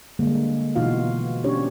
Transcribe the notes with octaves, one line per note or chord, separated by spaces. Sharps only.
D3 G3 G#3 A#3
B2 E3 D#4 F4 F#4 F5
C#4 D4 G4 C#5